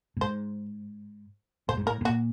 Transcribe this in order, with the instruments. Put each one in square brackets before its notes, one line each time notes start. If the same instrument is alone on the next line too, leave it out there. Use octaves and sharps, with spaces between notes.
[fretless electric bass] A2
[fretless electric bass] G#2 [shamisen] C5
[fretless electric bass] A2 [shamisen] C5
[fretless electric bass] G#2
[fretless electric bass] A2 [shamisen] A#4
[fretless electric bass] A2
[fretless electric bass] A#2 [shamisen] F#4